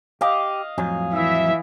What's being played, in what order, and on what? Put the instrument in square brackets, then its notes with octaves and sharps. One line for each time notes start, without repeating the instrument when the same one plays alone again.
[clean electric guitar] G4 [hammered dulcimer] D#5 F5
[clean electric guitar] F2 A2 F#3 [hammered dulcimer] G#5
[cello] E3 [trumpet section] E5